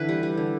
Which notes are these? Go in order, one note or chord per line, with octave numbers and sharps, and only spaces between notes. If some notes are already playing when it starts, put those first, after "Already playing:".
Already playing: D3 E3 B4
G3
G3
D3